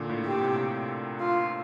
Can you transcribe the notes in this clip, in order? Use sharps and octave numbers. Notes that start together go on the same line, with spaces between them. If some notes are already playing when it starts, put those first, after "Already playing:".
Already playing: A#2 D3
A2
A2 G4
A2 C3
F4